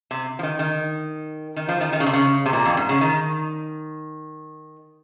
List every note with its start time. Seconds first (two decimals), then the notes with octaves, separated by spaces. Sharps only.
0.11 C3
0.39 F3
0.43 D#3
0.59 D#3
1.56 D#3
1.69 F3
1.81 D#3
1.93 D#3
2.00 C#3
2.06 C3
2.13 C#3
2.46 C3
2.53 A#2
2.65 F2
2.77 G#2
2.89 C#3
3.01 D#3